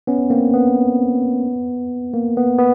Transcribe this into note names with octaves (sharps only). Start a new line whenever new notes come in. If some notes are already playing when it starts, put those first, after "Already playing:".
B3 C#4
A#3 C4
B3
A#3
B3
B3